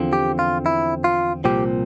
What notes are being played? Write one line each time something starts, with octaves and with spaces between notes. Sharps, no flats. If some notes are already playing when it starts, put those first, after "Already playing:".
Already playing: E2 D3 F3 C4
G4
F4
E4
F4
C2 A#2 F3 C4 G4